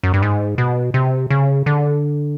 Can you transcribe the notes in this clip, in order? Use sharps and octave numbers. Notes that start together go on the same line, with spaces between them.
F#2
G2
G#2
B2
C3
C#3
D3